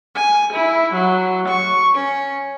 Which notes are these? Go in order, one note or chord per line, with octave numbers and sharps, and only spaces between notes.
G#5
E4
F#3
C#6
C#4